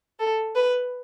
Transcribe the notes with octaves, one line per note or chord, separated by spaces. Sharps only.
A4
B4